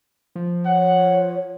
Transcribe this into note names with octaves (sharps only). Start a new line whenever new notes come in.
F3
C#5 F#5